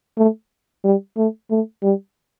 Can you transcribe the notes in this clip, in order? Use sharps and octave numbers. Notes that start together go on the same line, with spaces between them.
A3
G3
A3
A3
G3